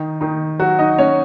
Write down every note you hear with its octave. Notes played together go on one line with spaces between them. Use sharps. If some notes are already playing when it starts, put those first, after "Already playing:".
Already playing: D#3 D#4
D#3 D#4
F#3 F#4
D#4 D#5
C#4 C#5